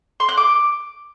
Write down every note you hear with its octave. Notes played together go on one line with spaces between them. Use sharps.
C6
F#6
D6